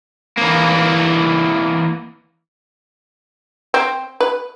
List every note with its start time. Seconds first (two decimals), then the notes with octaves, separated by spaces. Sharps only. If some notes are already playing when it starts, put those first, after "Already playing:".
0.38 E3 A#3
3.74 C4
4.20 B4